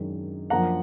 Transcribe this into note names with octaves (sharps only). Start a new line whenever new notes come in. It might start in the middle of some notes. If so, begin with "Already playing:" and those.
Already playing: F#2 D#3 G#3 D4
F#2 F3 A#3 D4 F#5 A#5